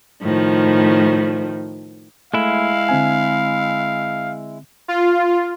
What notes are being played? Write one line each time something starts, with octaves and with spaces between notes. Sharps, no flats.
A2 D#3 F3
G#3 A3 E4 F5
D3 C4 G#5
F4